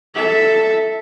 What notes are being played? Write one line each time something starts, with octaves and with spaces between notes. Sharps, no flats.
A4 E5